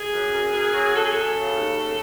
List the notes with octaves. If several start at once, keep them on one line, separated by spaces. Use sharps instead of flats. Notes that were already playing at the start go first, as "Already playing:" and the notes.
Already playing: G#4
F#2
F#2
F#2
F#3
F#2 A4
G#4
F#2 A4
C#3
D#2
C#3